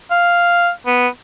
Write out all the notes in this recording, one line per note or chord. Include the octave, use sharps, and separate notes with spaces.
F5
B3